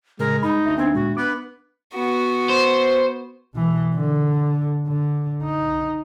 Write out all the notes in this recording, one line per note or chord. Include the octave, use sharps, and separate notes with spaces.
A2 C#3 G#3 A#4
G2 D#4 B5
D2 E5
B3 C4 D4 D#4 G#6
D#2 A#2 G#3 F#4
B3 B4 D6
B3 F#4
C5
B2 E3
D3
D3
D#4